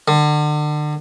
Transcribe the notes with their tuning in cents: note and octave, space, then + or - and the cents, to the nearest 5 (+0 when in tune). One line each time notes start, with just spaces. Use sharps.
D3 +35